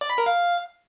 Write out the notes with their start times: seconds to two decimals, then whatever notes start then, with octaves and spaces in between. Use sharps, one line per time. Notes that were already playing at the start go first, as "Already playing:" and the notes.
0.01 D5
0.10 B5
0.18 A#4
0.26 F5